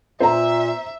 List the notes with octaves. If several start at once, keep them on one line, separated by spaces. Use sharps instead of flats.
A#2 B3 C5 E5 A#5 C7